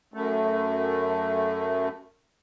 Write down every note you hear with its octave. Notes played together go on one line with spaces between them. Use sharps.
F#2 A3